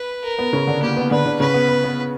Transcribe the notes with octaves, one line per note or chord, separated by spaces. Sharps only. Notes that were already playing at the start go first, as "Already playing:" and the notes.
Already playing: B4
A#4
B3
C#3 C#4
D3 D4
A#3 G4
B3
D3 D4 B4
D3 D4
C#3 C#4 B4
B3
B3
B3